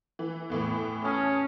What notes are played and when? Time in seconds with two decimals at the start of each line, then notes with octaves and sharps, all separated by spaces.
0.19 E3
0.50 E2 A2 E3
1.05 C#4 A5 D#6 F6